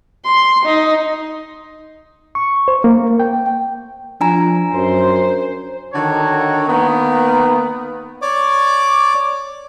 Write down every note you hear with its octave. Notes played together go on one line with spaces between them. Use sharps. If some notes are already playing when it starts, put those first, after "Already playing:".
C6
D#4
C#6
C5
A#3
G5
F3 D4 G#5 A#5
F#2 C5
D3 D#3 F#4 A4 C#5
D#3 A#3 B3
C#5 D5 D6